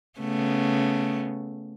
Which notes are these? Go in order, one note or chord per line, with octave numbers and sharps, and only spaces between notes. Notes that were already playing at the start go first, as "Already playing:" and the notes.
C#3 A3 B3